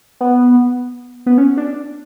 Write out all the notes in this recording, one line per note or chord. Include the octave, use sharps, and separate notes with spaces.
B3
B3
C#4
D4